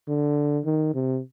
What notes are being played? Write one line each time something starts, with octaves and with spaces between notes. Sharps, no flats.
D3
D#3
C3